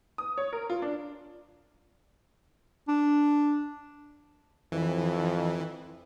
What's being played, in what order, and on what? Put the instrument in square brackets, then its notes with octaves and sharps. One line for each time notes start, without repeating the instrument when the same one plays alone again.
[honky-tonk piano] D#6
C#5
A#4
F4
D4
[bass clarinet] D4
[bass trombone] F2 [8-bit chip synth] E3